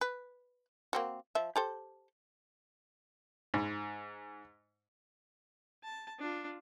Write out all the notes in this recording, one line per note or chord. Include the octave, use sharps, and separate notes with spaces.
B4
A#3 C4 F#4
F3 E5
G4 A4 C5
G#2
A5
D4 F4